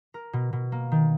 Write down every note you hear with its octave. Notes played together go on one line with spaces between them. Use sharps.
A#4
B2
B2
A#3
D#3